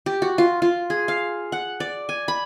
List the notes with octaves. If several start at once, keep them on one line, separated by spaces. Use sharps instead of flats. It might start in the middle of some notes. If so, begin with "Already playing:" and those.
G4
F#4
F4
F4
G#4
F5
F#5
D5
G#5
B5